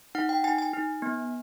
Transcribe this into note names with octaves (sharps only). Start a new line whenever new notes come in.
D#4 F#5
G5
D#4 G#5
G#5
D#4
B3